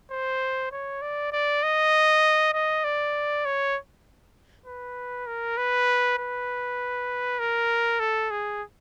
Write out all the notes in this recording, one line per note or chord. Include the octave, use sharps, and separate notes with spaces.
C5
C#5
D5
D5
D#5
D#5
D5
C#5
B4
A#4
B4
B4
A#4
A4
G#4